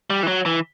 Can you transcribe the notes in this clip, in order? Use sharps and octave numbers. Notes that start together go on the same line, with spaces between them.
G3
E3
F#3
E3